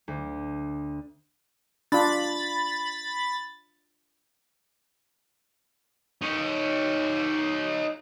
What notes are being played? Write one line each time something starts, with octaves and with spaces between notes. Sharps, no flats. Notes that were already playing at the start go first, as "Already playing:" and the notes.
D2
D4 F4 B5 A6
D#4 C#5